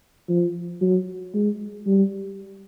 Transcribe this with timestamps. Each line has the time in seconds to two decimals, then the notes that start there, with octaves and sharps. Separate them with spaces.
0.29 F3
0.81 F#3
1.34 G#3
1.87 G3